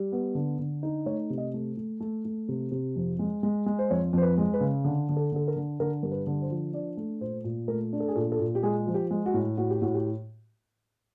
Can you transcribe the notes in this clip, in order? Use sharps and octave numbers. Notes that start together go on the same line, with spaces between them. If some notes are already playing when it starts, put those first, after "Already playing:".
Already playing: G3
B3
D3
D3
D#4
A3 C#5
C3
D#5
A3
A3
A3
A3
C3
C3
F2
G#3
G#3
G#3
C5
F2 C#5
F2 C5
B4
G#3
B4
C#3
D3
D3
A4
D3 A4
A#4
D3
D3 A#4
G2 A#4
B4
D3
C5
F3
D4 D5
A3
A#2 C5
A#2
A3 A#4
D4
A4
G#4
A#2 A4
A4
A#2
G4
G#3 G#4
F3
G4
G#3
F#4
A2
A2 F#4
G4
A2 F#4
G4